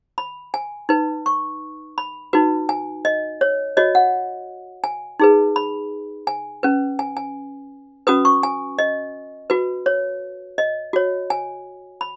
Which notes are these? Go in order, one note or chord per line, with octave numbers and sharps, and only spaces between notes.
B5
G#5
D#4 B4
C#6
B5
D#4 F#4 B4
G#5
D#5
C#5
F#4 C#5 D#5
F#5
G#5
D#4 G#4 B4
B5
G#5
C#4 B4
G#5
G#5
C#4 F#4 B4 D#6
C#6
G#5
D#5
F#4 B4
C#5
D#5
F#4 C#5
G#5
B5